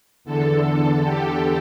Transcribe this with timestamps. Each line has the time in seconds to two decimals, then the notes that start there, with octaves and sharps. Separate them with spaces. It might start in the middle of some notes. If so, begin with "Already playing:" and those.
0.24 E2 D3 A4
1.03 G4